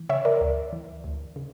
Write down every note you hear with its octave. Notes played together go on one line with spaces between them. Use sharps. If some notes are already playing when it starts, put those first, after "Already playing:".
Already playing: E3
C#3 C#5 E5
A#4 D5
D2
E3
D2
C#3